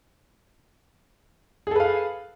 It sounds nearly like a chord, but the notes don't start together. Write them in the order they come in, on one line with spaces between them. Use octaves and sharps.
G#4 A4 B4 F5